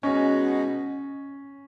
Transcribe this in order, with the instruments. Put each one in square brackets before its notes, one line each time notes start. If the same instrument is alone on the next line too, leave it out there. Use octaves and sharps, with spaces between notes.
[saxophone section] B2 G#3 D#4 F#4 [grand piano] C#4